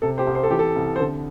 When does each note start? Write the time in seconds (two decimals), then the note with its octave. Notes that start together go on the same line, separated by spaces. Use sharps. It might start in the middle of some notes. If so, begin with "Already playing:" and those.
0.02 C3 A4
0.18 G4 C5
0.27 C2
0.35 C5
0.43 A4
0.50 E3 G4
0.59 A4
0.76 C2
0.96 C5
1.00 D3 A4